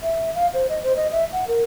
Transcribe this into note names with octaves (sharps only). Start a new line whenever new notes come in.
E5
F5
C5
D#5
C5
D#5
E5
F#5
A#4